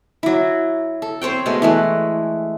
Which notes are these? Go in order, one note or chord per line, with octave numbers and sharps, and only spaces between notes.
F#3 E4
A4
C4 C5 C#5 G5
B2 G#3 A3
E3 G#3 A3